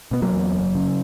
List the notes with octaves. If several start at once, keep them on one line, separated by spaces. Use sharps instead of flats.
B2 B3
F#3 A#3
E2
F#1
C#3